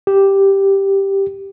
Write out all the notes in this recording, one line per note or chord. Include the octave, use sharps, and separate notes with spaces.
G4